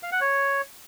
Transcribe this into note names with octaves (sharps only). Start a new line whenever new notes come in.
F5
F#5
C#5